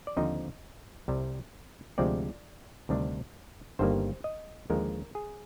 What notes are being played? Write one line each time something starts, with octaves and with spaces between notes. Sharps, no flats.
D5
D#2 D3 F3 C4 D#4 D#5
C2 C3 G3
D2 C3 F3 G#3 C4 D5
D2 C3 D#3 G3 D4
G1 G2 D#3 G3 A#3 C5
D#5
D#2 D3 F3 G#3 A#4
G#4